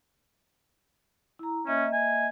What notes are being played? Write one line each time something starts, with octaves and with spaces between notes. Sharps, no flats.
E4 A#5
A#3 C#4 D#5 E5
G#5